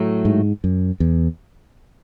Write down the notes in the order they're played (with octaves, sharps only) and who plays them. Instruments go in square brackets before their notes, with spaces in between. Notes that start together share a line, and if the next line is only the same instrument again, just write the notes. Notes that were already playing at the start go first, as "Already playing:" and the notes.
Already playing: [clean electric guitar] A2 F#3 A3
[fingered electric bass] G#2
F#2
E2